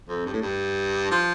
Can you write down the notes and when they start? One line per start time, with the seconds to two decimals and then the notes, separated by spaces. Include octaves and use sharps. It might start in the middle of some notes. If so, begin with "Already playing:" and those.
0.08 F2
0.26 G2
0.33 A2
0.42 G2
1.11 F3